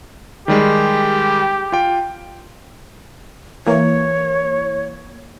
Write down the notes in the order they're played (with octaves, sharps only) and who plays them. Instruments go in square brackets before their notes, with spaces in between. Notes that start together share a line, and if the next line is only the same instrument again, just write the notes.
[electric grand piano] D#3 G3 G#3 [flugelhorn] G4
[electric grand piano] F4 G5
[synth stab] E3 A#3 [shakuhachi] C#5